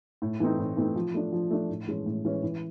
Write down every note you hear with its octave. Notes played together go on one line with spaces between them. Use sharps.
A2
E3 A3 C4 D#4
A2
E3 A3 C4 D#4
F3
A3 D4
F3
A3 D4
A2
E3 G#3 C#4
A2
E3 G#3 C#4
E3